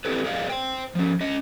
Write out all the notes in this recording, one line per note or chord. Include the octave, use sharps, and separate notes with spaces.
C4 D4 E4 G4 A4 B4
G#4 A#4 D5 D#5 F5
C5 G5
F3 C#4
C#4 D#5